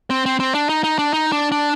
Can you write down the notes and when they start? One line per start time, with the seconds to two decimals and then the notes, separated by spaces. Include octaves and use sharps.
0.10 C4
0.26 C4
0.40 C4
0.55 D4
0.69 D#4
0.84 D#4
0.99 D4
1.13 D#4
1.32 D4
1.52 D4